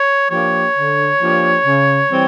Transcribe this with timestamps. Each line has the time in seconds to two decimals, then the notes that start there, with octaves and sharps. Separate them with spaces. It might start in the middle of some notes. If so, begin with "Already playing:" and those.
Already playing: C#5
0.31 F3 A#3 D4 G4 C#5
0.75 D3
1.20 F3 A#3 D4 G4
1.65 C#3
2.10 E3 G3 C4